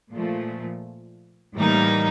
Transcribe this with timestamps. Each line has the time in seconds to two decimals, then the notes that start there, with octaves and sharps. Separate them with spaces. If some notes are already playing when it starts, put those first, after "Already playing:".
0.11 A#2 F3 A3
1.56 A2 E3 G3 A#3 D#4